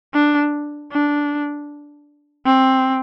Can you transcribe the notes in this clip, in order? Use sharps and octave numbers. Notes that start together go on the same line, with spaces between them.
D4
D4
C4